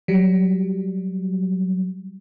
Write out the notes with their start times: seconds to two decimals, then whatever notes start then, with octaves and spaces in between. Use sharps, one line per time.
0.08 F#3 G3